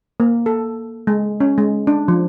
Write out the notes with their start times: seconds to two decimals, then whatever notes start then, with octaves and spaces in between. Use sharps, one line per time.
0.20 A#3
0.46 A4
1.07 G#3
1.40 C#4
1.58 G#3
1.87 D4
2.08 F3